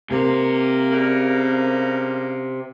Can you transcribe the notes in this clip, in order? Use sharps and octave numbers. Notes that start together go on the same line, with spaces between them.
C3 A#3
C#3 G3 A#3